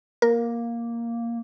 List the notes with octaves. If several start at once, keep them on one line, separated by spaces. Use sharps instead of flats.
A#3 A#4